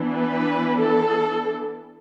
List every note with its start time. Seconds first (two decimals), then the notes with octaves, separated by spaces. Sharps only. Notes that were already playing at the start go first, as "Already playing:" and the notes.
Already playing: E3 B3 D4
0.12 B4
0.79 A4